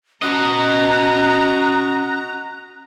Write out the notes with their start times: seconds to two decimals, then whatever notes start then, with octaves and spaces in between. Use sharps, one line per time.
0.22 C#4 F#4 D#5 A#5 F#6